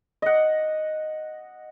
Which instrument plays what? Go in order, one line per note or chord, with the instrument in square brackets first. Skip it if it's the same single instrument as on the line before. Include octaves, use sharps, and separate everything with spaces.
[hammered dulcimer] D#5 F#5